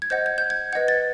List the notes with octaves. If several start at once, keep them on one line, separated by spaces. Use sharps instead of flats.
G#6
C5 D#5 F#5 G6
G#6
G6
G#6
B4 D#5 F#5 G#6
A6